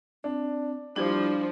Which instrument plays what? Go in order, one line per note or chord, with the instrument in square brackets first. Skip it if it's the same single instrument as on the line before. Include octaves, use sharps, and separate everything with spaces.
[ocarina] C4 [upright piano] D4
[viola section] F3 [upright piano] G3 [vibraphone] D4 [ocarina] E4